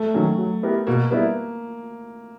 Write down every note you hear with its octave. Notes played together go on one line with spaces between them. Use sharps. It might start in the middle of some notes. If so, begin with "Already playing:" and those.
Already playing: A3
D#3 F#3 A#3 C#4
F#3
B3 E4 G4 A#4
B2 A#3
G3 A#3 B3 E4